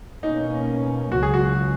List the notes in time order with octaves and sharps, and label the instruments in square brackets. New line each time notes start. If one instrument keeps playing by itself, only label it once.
[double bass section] B2 A#3 C#4 [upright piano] D#4
[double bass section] C#2 C#3 F#3 [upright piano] F#4
[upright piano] G#4
F#4